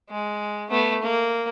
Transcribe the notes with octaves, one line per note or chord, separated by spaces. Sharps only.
G#3
A3 B3
A#3